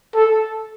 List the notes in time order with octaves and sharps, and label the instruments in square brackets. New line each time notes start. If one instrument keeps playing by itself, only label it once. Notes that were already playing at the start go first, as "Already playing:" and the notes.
[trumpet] A4